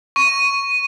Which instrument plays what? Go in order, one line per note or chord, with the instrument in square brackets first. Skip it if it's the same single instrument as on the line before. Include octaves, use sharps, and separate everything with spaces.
[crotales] C#6 D#7